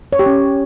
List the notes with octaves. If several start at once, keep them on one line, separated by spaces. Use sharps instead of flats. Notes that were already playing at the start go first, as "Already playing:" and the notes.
C#5
G4
C#4